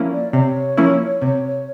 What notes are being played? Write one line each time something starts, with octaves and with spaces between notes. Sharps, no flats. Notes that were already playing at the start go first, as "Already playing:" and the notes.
Already playing: F3 A#3 C#4 E4
D5
C3 C#5
F3 A#3 C#4 E4
C3